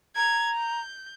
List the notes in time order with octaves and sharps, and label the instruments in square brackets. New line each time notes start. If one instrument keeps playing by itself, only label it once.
[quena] A#5 [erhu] G#6
[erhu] G6